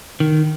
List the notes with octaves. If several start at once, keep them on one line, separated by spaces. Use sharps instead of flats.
D#3